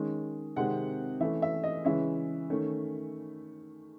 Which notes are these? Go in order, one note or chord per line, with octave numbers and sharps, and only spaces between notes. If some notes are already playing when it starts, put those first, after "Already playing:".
Already playing: D#3 G#3 C#4
C3 D#3 G#3 C4 F#5
E3 A3 C#4 E5
E5
D#5
C#3 E3 G#3 C#4 E5
D#3 A3 C#4